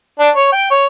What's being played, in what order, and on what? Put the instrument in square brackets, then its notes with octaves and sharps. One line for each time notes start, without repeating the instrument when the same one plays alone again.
[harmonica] D4
C#5
G5
C#5